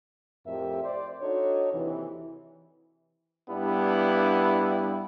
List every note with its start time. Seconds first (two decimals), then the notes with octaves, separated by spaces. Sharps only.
0.47 F2 A2 G4 A#4 E5
0.84 C5 D5
1.22 D4 D#4 F#4 A4 C#5
1.74 D#2 C3 E3
3.48 G2 G3 B3 D4 E4